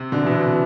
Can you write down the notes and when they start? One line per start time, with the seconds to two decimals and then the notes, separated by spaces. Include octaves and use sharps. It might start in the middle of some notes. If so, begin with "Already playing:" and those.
Already playing: C3
0.12 B2 D3
0.22 B2 E3
0.31 C3